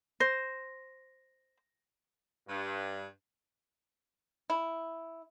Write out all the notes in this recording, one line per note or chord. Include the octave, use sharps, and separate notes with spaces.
C5 A#6
G2
E4